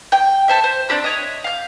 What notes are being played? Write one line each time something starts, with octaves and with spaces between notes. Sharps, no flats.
G5
A4 C5 E5
C5
C4 D4 G4 E6
C#5 D#5 E5
F5 G6